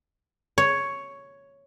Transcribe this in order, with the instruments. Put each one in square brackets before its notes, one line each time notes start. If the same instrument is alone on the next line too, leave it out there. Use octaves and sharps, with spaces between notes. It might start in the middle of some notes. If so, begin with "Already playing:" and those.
[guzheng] C#5